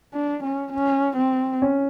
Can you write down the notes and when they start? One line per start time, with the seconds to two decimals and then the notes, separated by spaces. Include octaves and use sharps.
0.14 D4
0.44 C#4
0.73 C#4
1.17 C4
1.62 C#4